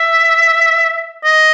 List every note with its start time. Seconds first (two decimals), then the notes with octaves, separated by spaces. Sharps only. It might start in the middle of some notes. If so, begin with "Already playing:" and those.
Already playing: E5
1.24 D#5